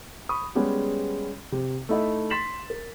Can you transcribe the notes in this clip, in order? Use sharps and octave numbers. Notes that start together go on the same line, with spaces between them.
B5 C#6 D#6
G3 G#3 B3 C#4 G4 G#4
C3
A3 D#4 E4 D#5 E5
C6 A6 B6 E7 F#7
A#4